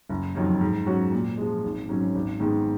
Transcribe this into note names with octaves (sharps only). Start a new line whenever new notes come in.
F#1
F2 D#3 F#3
G#2
F#3 C#4 F#4
A#2
F3 G#3
G#1
G#2 F#3 C#4
G#1
G#2 D#3 G#3 B3